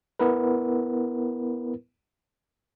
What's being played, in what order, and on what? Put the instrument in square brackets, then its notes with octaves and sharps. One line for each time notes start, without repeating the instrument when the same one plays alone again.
[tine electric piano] B3 E4 A#4 B4